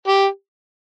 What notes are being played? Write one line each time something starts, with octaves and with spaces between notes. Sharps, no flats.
G4